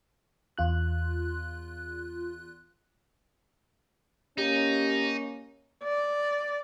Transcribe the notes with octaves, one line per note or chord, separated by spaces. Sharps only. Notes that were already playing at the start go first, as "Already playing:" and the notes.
E2 F4 F#6
A#3 C#4 D#4 G4
D5